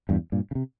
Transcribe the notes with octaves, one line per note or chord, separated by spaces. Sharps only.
E2 G2
G2 A#2
C#3
C3